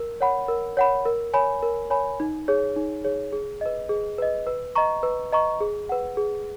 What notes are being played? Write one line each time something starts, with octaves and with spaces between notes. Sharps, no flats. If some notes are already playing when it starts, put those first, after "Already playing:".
Already playing: A#4
C#5 F#5 B5
A#4
C#5 F#5 B5
A#4
C#5 G#5 B5
A#4
C#5 G#5 B5
D#4
G#4 C#5
D#4
G#4 C#5
G#4
B4 D#5
G#4
B4 D#5
B4
D#5 A#5 C#6
B4
D#5 A#5 C#6
G#4
B4 F#5
G#4